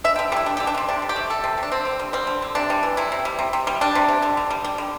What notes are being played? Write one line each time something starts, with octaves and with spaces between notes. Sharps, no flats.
D3 E5
G5
D3
G3 D4 E4
G3 D4
G4
D3
D4
D3 C4
C3 D4
C3
G4
A3
A3 A4
C3
C3
D4
D3 C4
D3
G3
G3 C4
D3
D3
C3 D4
G3
E3
C3 E4
C3
G3
C3
C3
G3
G3 D4
C3
C3
D3
D3
G3
G3
D3